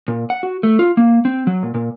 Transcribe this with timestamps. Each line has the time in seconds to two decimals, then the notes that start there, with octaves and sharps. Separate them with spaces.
0.08 A#2
0.30 F#5
0.43 F#4
0.63 A3
0.79 F4
0.97 A#3
1.25 C4
1.47 F#3
1.63 A#2
1.74 A#2